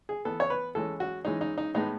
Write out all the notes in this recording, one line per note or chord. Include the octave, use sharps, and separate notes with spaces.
G#4
E3 B3 A4
C#5
B4
E3 G#3 C#4 A4
F#4
E3 G#3 C#4 D#4
D#4
D#4
A2 G#3 B3 D#4